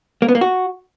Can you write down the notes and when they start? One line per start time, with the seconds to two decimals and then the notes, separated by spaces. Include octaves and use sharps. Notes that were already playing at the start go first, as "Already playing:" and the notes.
0.22 A#3
0.28 B3
0.35 A#3
0.41 F#4